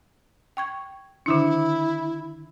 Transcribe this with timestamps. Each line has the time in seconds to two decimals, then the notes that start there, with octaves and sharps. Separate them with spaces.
0.57 G5 C#6 G#6
1.26 D3 D#3 D4 E4